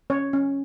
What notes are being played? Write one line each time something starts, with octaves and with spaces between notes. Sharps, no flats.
C#4 C#5
C#4